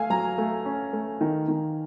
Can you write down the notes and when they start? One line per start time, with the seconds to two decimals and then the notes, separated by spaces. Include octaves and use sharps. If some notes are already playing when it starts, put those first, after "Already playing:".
Already playing: A3 F5 G#5
0.10 F#3 A#5
0.38 A3
0.66 C#4
0.93 A3
1.21 D#3
1.48 D#3